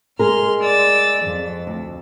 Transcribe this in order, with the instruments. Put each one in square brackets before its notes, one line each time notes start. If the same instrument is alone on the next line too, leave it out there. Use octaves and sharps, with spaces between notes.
[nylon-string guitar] G#3 G#4 A#4 [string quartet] C6 F6
[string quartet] D5 E6 A6
F2
[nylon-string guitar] D2